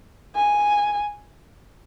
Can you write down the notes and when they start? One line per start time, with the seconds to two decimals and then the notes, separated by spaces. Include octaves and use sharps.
0.36 G#5